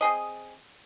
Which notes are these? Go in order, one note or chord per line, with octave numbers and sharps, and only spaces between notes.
C4 G#4 D#5